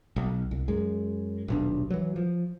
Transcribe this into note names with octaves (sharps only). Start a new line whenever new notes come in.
B1
C2
F#2 G#3
D#1 B1 D4
E3 F#3
F3